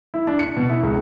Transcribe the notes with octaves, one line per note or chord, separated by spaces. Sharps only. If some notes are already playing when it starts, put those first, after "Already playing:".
E4
D4
C#7
B2
E4
C#2